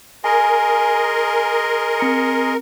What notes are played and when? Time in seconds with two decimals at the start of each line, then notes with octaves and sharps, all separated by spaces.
0.24 G#4 A#4 D#5 G#5 C6
2.00 C4 A#5 C#7